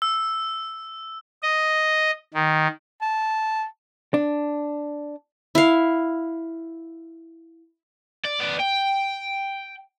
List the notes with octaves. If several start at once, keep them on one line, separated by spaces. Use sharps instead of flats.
E6
D#5
D#3
A5
D4
E4 F5
D5
B3 D5
G5